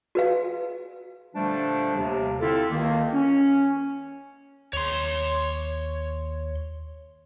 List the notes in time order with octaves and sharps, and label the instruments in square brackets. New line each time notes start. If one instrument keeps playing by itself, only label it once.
[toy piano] F#4 B4 F5
[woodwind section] A#2 D3 F3 G3 A3 D4
D#2 C3
D3 C4 E4 F4 A4
C#2 D#3 A#3
C#4
[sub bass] D#2 [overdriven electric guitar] C#5 C6